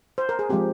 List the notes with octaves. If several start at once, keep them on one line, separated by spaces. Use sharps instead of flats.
C5
A#4
G#4
F3 G#3 C4 G4